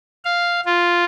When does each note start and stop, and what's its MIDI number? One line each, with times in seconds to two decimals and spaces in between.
0.25 0.61 77
0.65 1.04 65